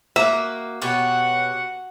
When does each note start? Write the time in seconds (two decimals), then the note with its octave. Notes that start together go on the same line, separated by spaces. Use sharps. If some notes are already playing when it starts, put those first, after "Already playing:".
0.16 A#3 F#4 E5
0.82 B2 F#4 G4 C#5 F#5